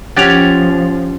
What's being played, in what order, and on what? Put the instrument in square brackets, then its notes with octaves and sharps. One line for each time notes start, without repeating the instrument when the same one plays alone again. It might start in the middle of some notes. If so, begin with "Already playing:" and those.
[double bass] F3 [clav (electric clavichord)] C#4 G4 F#5 [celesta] A6 F7